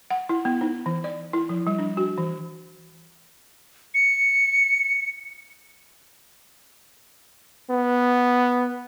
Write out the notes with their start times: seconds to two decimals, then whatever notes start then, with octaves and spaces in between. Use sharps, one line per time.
0.11 F#5
0.29 E4
0.45 B3
0.61 D#4
0.86 E3
1.04 D5
1.33 E4
1.49 F3
1.67 G3
1.79 D4
1.97 F#4
2.18 E3
3.94 C#7
7.70 B3